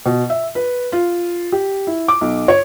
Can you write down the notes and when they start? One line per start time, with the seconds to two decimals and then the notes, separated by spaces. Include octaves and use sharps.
0.06 B2
0.30 E5
0.55 B4
0.92 F4
1.52 G4
1.87 E4
2.08 D6
2.21 B1
2.48 C#5